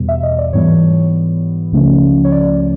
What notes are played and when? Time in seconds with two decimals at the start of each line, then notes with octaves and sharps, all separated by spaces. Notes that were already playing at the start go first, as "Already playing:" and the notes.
Already playing: E2 B2 G3 B3
0.09 E5
0.23 D#5
0.38 D5
0.53 G#2 E3 G3 B3 C#5
1.72 C#2 C#3 F3 A3 C#4
2.25 C#5
2.32 D5